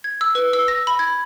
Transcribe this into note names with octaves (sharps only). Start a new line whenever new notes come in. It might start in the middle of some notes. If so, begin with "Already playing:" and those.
G#6
E6
B4
E6
A#6
B5
G#6